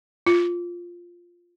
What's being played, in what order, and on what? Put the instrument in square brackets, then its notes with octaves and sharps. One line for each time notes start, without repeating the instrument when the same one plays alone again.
[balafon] F4